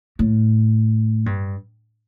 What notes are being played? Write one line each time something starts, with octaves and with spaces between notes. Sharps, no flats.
A2
G2